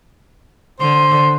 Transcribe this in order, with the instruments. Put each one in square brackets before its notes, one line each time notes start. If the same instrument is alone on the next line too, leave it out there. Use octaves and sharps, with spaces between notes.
[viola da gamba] D3 [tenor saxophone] C5